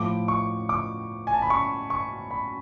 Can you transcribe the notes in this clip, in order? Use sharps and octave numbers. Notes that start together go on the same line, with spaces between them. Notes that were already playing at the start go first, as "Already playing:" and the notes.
Already playing: A2 F3 A3 D6
C#6
D6
G#5
A5
B5
C#6
C#6
B5